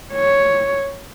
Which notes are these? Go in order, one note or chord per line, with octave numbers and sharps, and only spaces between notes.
C#5